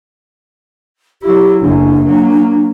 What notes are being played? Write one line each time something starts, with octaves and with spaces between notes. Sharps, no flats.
F#3 E4 G4
F#1 F#2 D4
F#3 A#3